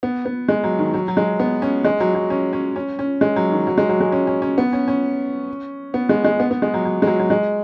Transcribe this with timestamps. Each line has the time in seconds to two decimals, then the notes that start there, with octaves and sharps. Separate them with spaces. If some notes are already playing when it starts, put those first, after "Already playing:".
0.03 B3
0.25 B3
0.48 G#3
0.64 F#3
0.79 D#3
0.94 F#3
1.08 F#3
1.17 G#3
1.39 B3
1.62 C#4
1.84 G#3
2.00 F#3
2.15 F#3
2.30 C#4
2.53 C#4
2.76 C#4
2.99 C#4
3.21 G#3
3.36 F#3
3.52 D#3
3.67 F#3
3.78 G#3
3.89 F#3
4.00 G#3
4.12 C#4
4.27 C#4
4.42 C#4
4.58 B3
4.73 C#4
4.88 C#4
5.94 B3
6.09 G#3
6.24 G#3
6.40 B3
6.51 B3
6.62 G#3
6.74 F#3
6.85 F#3
7.02 G#3
7.07 F#3
7.19 F#3
7.30 G#3